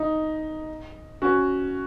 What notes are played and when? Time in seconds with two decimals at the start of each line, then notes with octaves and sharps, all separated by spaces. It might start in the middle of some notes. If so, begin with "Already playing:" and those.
Already playing: D#4
1.22 C#4 F#4